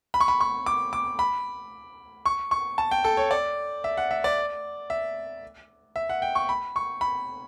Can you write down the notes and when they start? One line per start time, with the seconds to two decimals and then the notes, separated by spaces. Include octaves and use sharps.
0.14 B5
0.20 C#6
0.28 B5
0.40 C#6
0.66 D6
0.93 D6
1.19 B5
2.26 C#6
2.51 C#6
2.78 A5
2.91 G5
3.04 A4
3.17 C#5
3.31 D5
3.84 E5
3.97 F#5
4.11 E5
4.24 D5
4.90 E5
5.96 E5
6.09 F#5
6.22 G5
6.35 C#6
6.49 B5
6.76 C#6
7.01 B5